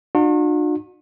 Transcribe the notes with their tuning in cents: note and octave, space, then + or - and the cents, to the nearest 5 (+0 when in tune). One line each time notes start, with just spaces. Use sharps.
D4 +45 F#4 -40